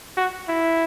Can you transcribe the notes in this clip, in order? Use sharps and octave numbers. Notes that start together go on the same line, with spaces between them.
F#4
E4